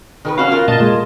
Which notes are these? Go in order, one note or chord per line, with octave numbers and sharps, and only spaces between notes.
D#3 A#4 B4
C#4 F#4 C#5 F5
F4 A#4
A#2 D#5 A5
G#3